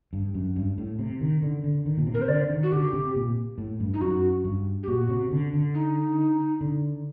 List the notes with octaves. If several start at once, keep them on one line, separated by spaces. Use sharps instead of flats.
G2
F#2
G2
A2
C3
D#3
D3
D3
D#3
A#2
C3
A#4
C5
D3 D5
D#3
F#4
D3 G4
C3
A#2
A2
G2
D#4
F#2 F#4
G2
G4
A#2 F#4
C3
D3
D3
D#4
D3